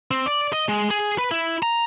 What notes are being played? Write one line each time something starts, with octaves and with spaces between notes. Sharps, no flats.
C4
D5
D#5
G#3
G#4
B4
E4
A#5